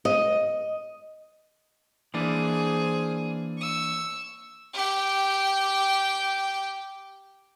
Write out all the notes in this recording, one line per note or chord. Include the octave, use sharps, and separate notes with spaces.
D#5
E3 A#3 D4 G#4 C5
C#6 E6
G4 G5